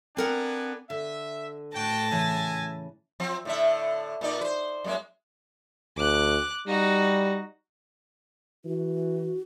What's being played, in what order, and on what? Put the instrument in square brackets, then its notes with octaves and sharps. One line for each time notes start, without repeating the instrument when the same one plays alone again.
[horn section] B3 D4 G#5 [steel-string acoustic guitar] C4 A#4 F#5
[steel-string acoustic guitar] D3 [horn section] E5
[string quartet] A2 A5 A#6 [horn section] F#4 G5
[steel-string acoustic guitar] C#3 E3 [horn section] E5 G#5
[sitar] F3 C4
A2 D3 E5
A#2 D#4 D5
B4 C5
F#2 G#3 A#3
[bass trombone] D2 [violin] D6 F#6
[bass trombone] G3 [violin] D#4 F#4
[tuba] E3 [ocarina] F#4